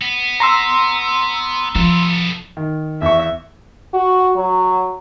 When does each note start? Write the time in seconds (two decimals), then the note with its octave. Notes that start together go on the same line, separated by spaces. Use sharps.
0.02 B3
0.40 A#5 C6 E6
1.75 F3 B3 A4
2.57 D#3
3.02 E2 E5 C#6
3.94 F#4
4.35 F#3